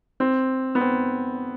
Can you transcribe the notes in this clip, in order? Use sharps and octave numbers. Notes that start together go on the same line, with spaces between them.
C4
B3
C4